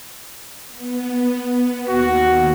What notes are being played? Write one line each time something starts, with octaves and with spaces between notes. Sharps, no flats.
B3
D#2 F#4